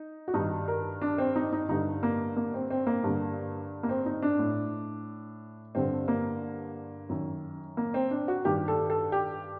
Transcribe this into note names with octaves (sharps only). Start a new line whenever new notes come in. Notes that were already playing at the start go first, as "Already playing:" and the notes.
Already playing: D#4
F#4
G2 D#3 D#4
A#4
D4
C4
D#4
D#4
G2 D3 D#4
A#3
A#3
C4
C4
A#3
G2 D3
A#3
C4
D#4
D4
A2
G2 D3 C4
A#3
F#2 D#3
A#3
C4
D4
F#4
G2 D#3 G4
A4
A4
G4